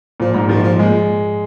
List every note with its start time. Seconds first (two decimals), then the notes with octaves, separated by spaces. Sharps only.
0.20 A#2 F3
0.34 G#2
0.49 D#3 F3
0.63 F3
0.79 A#2 G#3